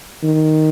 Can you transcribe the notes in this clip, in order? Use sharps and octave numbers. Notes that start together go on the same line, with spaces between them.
D#3